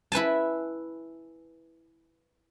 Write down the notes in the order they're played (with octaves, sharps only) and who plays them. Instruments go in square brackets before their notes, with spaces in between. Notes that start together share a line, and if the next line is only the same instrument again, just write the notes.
[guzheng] E4 B4 G#5 A5